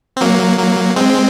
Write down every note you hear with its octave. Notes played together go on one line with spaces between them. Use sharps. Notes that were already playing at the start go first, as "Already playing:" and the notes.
C4
F#3 A#3
F#3 A#3
G#3 C4